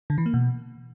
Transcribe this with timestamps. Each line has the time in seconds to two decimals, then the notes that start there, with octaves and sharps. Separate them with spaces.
0.10 D3
0.18 E3
0.26 A#3
0.34 B2